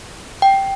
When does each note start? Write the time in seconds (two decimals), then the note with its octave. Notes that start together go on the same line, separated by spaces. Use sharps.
0.42 G5